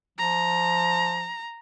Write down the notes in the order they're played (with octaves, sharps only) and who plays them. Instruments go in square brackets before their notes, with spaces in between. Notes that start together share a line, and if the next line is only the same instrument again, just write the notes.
[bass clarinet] F3 [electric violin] A#5